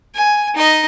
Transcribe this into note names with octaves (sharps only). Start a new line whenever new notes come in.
G#5
D#4 D#5